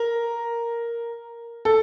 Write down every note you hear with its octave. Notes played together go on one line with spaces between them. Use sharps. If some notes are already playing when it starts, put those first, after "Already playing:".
Already playing: A#4
A4